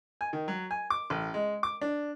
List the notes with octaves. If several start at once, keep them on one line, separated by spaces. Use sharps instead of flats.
G#5
D#3
F#3
G#5
D6
A1
G#3
D6
D4